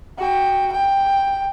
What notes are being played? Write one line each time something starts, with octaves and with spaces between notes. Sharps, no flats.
F#4 G5
G5